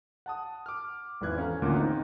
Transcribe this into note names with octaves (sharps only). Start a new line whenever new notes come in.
F#5 A5 D#6
D6 F6
G#1 E2 E3 F#6 G#6
C#4 A4 F5 G#5 A#5
A1 D2 D#3 A#3 F4 D6
C4 D#4